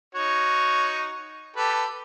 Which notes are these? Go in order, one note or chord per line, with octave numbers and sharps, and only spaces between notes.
D#4 F#4 C#5
G4 A4 B4